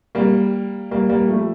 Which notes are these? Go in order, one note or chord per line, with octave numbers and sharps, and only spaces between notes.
G3 A#3
G3 A#3
G3 A#3
F3 A3